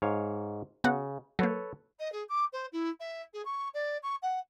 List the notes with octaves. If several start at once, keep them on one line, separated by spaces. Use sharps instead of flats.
G#2 C#5 F5
C#3 B3 F#4 F#5
F#3 A#3 A4 B4 C#5
D#5
G#4
D6
C5
E4
E5
G#4
C#6
D5
C#6
F#5